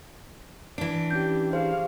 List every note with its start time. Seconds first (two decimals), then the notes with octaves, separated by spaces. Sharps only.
0.78 E3 D4 D7
1.11 C#4 G4 G6
1.53 G4 G#4 C5 F5